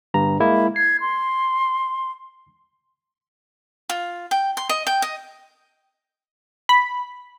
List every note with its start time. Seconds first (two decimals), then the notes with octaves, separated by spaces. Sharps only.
0.14 G1 G2 A#5
0.40 G#3 A#3 E4
0.76 G#6 C7
1.01 C6
3.90 F4
4.31 G5
4.57 C6
4.69 D#5
4.87 G5
5.02 D#5
6.69 B5